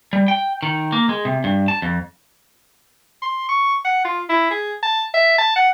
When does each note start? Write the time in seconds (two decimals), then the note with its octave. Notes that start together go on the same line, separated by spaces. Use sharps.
0.13 G3
0.28 G5
0.63 D#3
0.92 A#3
1.09 G#3
1.25 C3
1.44 G2
1.68 A5
1.82 F2
3.22 C6
3.49 C#6
3.85 F#5
4.05 F4
4.29 E4
4.51 G#4
4.83 A5
5.14 E5
5.38 A5
5.56 F#5